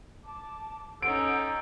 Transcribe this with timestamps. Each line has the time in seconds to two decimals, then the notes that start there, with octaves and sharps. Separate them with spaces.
0.24 A5 D6
1.02 C#4 D#4 A4 F#5 G6 D7